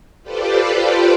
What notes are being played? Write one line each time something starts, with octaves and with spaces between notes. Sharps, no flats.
F4 G4 A4 B4 C5 D5